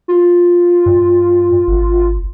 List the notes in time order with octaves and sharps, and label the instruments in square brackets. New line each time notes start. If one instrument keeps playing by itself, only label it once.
[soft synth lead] F4
[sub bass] G2
G#1